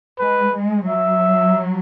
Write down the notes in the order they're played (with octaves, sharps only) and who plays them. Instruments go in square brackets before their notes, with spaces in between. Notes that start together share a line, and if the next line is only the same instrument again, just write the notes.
[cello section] G#3 [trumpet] B4
[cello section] G#3
[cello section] F#3 [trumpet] E5